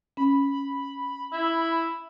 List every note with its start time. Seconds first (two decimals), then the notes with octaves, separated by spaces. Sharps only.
0.17 C#4 B5
1.33 E4